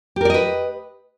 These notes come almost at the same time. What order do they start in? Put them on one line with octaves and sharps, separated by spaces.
G4 A#4 D5 D#5 B4